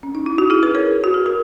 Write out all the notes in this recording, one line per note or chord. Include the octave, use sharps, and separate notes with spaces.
C#4
D#4
E4
F#4
E4 G#4
G#4 B4
A#4 C#5
F#4
G#4
F#4 A#4